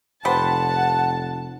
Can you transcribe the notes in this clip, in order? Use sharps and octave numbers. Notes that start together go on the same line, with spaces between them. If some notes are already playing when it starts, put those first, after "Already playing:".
F1 G4 B4 C5 F#5 A5